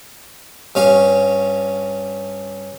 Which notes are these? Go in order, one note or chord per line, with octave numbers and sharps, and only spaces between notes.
G2 C#4 F5 C#6